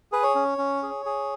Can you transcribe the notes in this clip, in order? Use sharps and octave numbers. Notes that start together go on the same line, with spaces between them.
G#4 B4
C#5
C#4
C#4
G#4
G#4